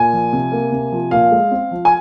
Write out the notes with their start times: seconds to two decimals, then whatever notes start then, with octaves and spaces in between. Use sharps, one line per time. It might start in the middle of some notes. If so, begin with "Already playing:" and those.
Already playing: A#2 G#5
0.13 F3
0.33 C3
0.52 A#3
0.72 C3
0.92 F3
1.11 A#2 F5
1.31 G#3
1.51 C4
1.71 F3
1.85 G#5